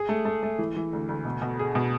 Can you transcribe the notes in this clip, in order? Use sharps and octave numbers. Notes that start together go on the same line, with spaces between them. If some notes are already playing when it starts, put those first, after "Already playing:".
Already playing: G#4
A3
A3
A3
E3
E3
D2
D2
B2
B2
G#4
B2